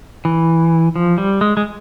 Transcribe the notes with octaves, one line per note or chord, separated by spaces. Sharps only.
E3
F3
G3
G#3
G#3